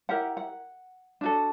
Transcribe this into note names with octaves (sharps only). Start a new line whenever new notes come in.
E4 G4 A#4 F#5
F#5
D4 F#4 A4